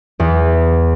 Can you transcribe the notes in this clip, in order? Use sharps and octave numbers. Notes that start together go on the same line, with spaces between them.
E2